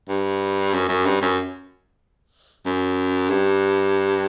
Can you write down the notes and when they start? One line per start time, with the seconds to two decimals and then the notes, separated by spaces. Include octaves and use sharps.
0.09 G2
0.74 F#2
0.89 F#2
1.05 G2
1.22 F#2
2.66 F#2
3.30 G2